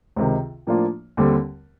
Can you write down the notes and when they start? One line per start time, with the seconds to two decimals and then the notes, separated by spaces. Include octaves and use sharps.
0.16 C#2 C3 D#3
0.67 A2 F3 A#3 D4 F4
1.17 D#2 D3 G3 C4